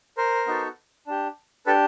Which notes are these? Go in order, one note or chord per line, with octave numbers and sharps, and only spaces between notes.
A#4 C5
B3 D#4 F#4 A4
D4 G4
D4 G4 A4 B4